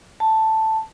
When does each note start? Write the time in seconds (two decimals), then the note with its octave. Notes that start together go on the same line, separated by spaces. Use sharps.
0.20 A5